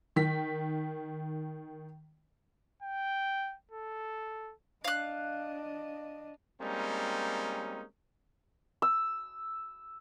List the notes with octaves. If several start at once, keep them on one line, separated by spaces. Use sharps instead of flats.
D#3 B6
G5
A4
D4 D#5 F5 F#6
G3 G#3 A#3 C4 C#4 D#4
E6